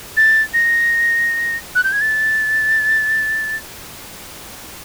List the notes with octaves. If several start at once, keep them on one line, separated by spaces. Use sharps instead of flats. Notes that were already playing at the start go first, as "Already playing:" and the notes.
A6
A#6
F#6
G6
G#6
A6